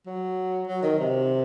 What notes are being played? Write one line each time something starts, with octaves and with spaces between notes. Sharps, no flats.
F#3
F#3
D#3
C3